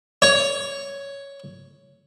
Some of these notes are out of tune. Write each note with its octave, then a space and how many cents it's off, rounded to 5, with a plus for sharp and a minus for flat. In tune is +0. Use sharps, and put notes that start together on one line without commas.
C#5 +5